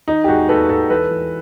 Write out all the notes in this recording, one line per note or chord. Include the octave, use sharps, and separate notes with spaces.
D#3 D#4
G4
E1 F#4 G#4
D#2 A4 B4
E1 A4 B4
E3 A4 B4
E3